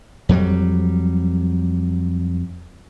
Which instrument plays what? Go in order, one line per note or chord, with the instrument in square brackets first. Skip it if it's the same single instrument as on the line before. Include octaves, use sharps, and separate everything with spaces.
[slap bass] F2 F#3 G3